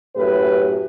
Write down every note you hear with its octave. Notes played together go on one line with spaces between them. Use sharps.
F#2 A2 G4 B4